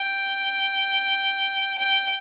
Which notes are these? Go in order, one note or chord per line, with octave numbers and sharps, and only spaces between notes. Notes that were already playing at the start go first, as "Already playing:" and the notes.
Already playing: G5
G5